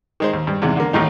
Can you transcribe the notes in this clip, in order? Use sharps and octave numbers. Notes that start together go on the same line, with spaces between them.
D#3 G#3 C5
D#2
G2
E2 G#2 C3
D3 A#3
A1 D#2 A2 D#4